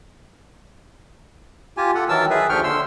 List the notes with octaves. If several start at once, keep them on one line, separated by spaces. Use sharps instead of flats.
F4 G4 G#5
F4 A4 F#5
D#3 E3 F#3 A#4 A5 E6
G#4 B4 E5
D#2 D3 F3 G5 C#6 F6
D3 C6 E6